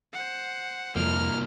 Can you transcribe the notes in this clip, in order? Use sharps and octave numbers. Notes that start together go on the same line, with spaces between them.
C5 F#5
C2 F2 A#3 F6